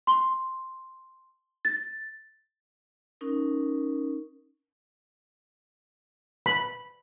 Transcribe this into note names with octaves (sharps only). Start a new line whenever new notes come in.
C6
A6
C#4 D#4 A#4
B5